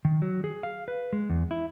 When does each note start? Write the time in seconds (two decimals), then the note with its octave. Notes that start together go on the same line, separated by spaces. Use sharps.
0.05 D#3
0.22 F#3
0.44 G#4
0.63 F5
0.88 B4
1.13 G#3
1.30 E2
1.51 E4